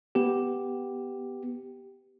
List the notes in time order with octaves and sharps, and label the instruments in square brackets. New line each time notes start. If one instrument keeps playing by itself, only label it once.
[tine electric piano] B3 G4